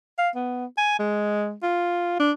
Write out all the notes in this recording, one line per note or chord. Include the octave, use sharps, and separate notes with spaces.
F5
B3
G#5
G#3
F4
D4